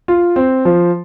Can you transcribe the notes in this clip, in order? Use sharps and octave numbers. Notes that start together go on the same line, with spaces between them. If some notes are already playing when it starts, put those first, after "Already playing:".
F4
C4
F3